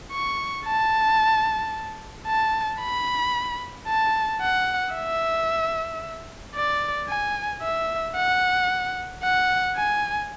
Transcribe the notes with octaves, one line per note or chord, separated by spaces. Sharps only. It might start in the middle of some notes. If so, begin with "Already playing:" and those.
C#6
A5
A5
B5
A5
F#5
E5
D5
G#5
E5
F#5
F#5
G#5